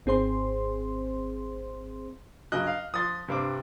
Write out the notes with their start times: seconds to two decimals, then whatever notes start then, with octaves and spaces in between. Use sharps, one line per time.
0.06 G#1 C4 G#4 C5 C6
2.52 G2 C#3 F#3 D#5 F#6
2.67 F5
2.94 F3 C6 D#6 A6
3.28 G2 C3 C4 D6